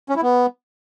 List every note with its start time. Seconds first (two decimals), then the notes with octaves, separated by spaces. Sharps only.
0.09 C#4
0.16 E4
0.22 B3